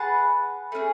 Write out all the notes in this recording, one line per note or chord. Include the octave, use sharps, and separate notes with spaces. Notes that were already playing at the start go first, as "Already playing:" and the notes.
Already playing: G#4 B4 F#5 A5
A3 C#4 G#4